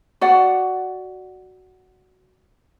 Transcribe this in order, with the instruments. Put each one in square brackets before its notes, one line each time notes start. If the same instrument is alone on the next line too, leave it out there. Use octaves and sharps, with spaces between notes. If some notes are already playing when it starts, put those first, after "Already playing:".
[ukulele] F#4 D5 F#5